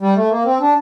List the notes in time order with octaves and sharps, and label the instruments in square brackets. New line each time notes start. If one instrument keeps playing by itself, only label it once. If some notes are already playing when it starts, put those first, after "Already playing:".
[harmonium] G3
A3
A#3
C4
D4